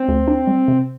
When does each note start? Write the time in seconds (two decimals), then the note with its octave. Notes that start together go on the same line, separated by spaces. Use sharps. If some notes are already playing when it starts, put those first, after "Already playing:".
Already playing: C4
0.08 D2
0.28 D4
0.47 G3
0.68 C3